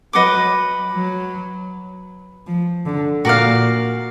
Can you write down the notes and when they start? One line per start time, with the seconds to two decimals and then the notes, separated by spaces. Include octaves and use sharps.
0.13 F#3 B4 D#5 F#5 D6
0.92 F#3
2.47 F3
2.86 D3
3.25 A#2 F#4 A#4 D5 F5